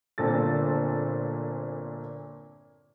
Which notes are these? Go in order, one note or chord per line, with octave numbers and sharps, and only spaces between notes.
G1 A#2 C4 A4 A6